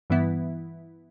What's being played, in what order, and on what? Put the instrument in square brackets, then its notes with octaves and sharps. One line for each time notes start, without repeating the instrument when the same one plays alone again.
[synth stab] G2 E3 B3 E4